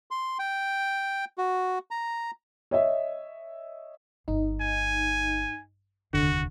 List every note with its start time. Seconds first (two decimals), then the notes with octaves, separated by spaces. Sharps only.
0.11 C6
0.39 G5
1.38 F#4
1.91 A#5
2.71 C#5 D#5 E5
4.28 G1 D#4
4.61 G#5
6.13 F1 D#2 D3 F#4